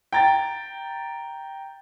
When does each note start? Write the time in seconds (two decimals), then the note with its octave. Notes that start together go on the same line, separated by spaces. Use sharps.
0.13 G5 A#5 A6